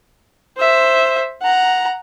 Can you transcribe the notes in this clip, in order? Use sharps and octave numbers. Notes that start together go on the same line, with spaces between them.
C5 E5
F#5 A#5